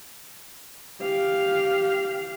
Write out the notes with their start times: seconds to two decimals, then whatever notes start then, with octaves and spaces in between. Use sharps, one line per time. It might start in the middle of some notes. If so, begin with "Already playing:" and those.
1.01 G4 F5